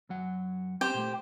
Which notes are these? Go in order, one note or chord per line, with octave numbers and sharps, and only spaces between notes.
F#2 F#3 F#5
C4 G4 C5 G5 C6
A#2 A3